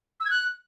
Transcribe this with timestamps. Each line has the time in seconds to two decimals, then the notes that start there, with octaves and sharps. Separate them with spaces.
0.20 E6
0.25 G#6
0.30 F#6